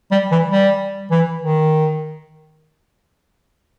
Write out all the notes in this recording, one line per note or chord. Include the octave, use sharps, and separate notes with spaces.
G3
E3
G3
E3
D#3